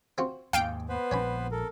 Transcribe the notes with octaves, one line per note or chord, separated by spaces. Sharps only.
C4 F4 F#4
D#2 G#2 F5 G5 D7
B3 B4 C5
A#1 D3 C4 C#5 G#5 B5
A4 A#4